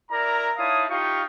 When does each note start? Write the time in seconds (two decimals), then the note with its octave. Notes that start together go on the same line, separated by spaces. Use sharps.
0.10 E4 A#4 D5 A#5
0.58 D#4 E4 C#5 F5 A5 D#6
0.89 D#4 F4 G4 F5 G5 C#6